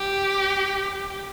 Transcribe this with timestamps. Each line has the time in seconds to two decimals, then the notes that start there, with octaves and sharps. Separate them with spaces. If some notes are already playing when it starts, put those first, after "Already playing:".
Already playing: G4